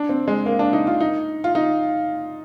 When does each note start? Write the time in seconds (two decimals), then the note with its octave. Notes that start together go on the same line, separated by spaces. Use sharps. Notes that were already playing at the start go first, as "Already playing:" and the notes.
Already playing: D4
0.09 C4
0.28 G#3
0.46 A#3
0.59 D4
0.73 D#4
0.87 F4
1.00 D#4
1.44 F4
1.55 D#4